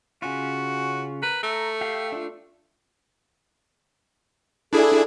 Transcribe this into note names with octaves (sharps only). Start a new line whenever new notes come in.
C#3 C#4 F4 F#4
A#4 B4
A3 A#5
G4 F5 G5
D4 F4
D4 E4 G#4 A4